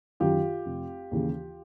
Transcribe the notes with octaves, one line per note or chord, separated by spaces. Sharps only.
F#2 D#3 F4 G4
F1
D#2 C#3 E3